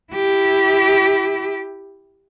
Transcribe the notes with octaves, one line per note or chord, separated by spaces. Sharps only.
E4 G4